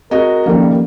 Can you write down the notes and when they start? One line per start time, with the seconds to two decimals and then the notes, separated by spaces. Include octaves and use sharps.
0.11 C4 F#4 G#4 A#4 D#5
0.46 D#3 F3 G3 A#3 C#4 A4